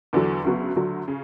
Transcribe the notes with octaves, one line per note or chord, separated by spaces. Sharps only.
E2 D3 F#3
D2 C#3 F#3 B3 F#4
D2 D3 F#3
C#3